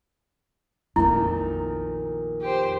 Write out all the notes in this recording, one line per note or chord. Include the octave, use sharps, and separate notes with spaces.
A#1 F2 A#2 D#3 A3 E4
G4 C5